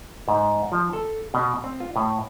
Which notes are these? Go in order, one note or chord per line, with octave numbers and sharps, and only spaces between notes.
G#2
F3
A4
B2
C4
F4
A2